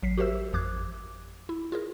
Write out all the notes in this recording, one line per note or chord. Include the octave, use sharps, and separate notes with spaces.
A1 F#3 B6 C7
F#4 G4 A#4 C5 E5 E6
G#1 F2 F3 D6 F#6 G#6
E4
F4 G#4 A#4